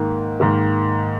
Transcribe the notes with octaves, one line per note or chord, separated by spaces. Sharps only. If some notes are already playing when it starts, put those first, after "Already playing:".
Already playing: G#2 D#3 A#3
G#2 D#3 A#3